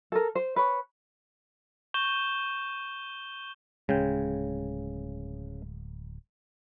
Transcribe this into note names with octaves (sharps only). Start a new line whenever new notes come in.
A4 A#4
C5
B4 C#5
C#6 G6 E7 G7
D1 C#3 G#3 G5